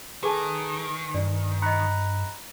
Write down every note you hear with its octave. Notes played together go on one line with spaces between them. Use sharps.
D#3 G#4 A4 B4 G#5 A5
G2 D5
D#5 A#5 B5 F#6 C#7